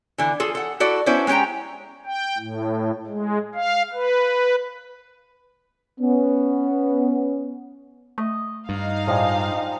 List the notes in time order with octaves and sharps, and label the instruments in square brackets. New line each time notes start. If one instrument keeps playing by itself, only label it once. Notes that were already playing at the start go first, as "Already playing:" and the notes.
[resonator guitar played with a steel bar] D3 E3
F4 G#4 A4
A4 F#5
E4 F#4 A4 D5
B3 C#4 D4 E4 C5
G#3 C#4 G4 G5 A#5
[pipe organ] G5
A2
G#3
F5
B4
[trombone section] B3 C#4
[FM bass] A3 [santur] D#5
[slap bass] G2 [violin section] D#4 F5
[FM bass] A2 [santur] F3 G3 G#3